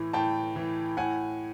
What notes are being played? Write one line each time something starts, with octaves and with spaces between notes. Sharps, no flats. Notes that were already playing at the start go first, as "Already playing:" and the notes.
Already playing: A2 E3
A2 G5 A5
E3
A2 F#5 G#5